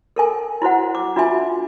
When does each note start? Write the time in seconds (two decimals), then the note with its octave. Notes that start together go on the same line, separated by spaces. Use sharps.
0.16 A4 A#4 G#5
0.62 E4 F#4 C5 F#5
0.95 D6
1.16 D4 F4 F#4 E5 G#5